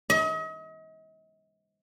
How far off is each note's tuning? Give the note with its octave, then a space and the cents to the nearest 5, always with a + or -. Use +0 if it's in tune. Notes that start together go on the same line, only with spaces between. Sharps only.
D#5 +40